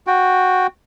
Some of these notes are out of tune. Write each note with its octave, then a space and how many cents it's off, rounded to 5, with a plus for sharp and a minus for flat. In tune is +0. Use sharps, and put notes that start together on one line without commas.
F#4 -5 G5 +0